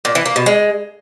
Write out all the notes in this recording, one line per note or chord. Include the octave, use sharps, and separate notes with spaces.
A#2
E3
A#3
B2
G#3